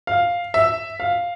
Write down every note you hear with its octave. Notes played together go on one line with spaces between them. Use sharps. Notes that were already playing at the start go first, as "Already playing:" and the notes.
F5
E5
F5